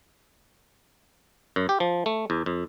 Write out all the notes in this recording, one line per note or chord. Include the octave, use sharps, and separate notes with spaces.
F#2
G4
F3
A3
E2
F2